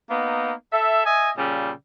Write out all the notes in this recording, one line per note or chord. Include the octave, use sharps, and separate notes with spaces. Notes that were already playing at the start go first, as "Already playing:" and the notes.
A#3 B3 D#4
A4 E5
D#5 E5 G#5
A#2 C#3 G3